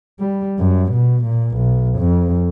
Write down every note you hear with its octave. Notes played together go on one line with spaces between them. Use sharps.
G3
F#2
B2
A#2
B1
F2